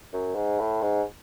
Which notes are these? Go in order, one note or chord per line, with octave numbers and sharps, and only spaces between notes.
F#2
G#2
A2
G#2